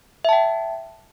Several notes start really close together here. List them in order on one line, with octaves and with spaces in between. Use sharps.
E5 A5 G5